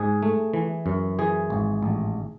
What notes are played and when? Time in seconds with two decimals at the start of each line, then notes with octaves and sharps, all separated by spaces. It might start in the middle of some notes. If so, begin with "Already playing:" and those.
Already playing: G#2 G#4
0.23 A3
0.54 E3
0.86 F#2
1.19 E3 G#4
1.50 G#1
1.83 A1